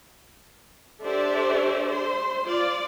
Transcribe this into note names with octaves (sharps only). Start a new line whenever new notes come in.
D4 G4 A4 C5 D5 E5
C5 C6
F4 D5